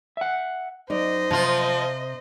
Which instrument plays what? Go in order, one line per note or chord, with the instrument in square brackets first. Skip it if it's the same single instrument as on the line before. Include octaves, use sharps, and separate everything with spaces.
[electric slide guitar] E5 F#5
[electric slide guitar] F#2 [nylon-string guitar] D#4 D5 [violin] C5 D#5
[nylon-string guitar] C3 [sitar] F3 F4